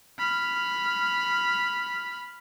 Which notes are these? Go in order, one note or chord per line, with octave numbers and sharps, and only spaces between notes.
B5 F6